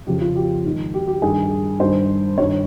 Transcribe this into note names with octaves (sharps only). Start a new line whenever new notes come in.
F2 C#3 F3 G4
F4
G4
G#2 D#3
G4
G4
G2 D#3 G#4
G2 D#3 C5
G2 D#3 C#5